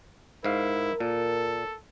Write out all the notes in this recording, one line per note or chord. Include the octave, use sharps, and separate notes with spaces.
G#2 E4 A#4 F5
A#2 A4